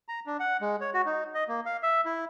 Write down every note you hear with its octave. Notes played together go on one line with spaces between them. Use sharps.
A#5
D4
F#5
G#3
C#5
F#4
D#4
D#5
A#3
F5
E5
E4